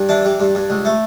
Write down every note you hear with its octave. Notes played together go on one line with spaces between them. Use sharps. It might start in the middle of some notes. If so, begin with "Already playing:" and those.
Already playing: G2
E3 D4
G3
G2
G2
C#2
A3